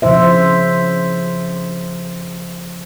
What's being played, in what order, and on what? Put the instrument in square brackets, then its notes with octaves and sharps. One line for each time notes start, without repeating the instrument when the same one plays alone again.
[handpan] C#3 F3 E4 C5 E5